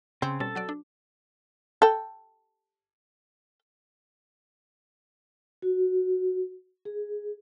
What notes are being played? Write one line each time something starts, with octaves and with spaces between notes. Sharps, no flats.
C#3 C4
B2 G3 C#4 A4 A5
F#3 F#4 D5
D4
A4 G5
F#4
G#4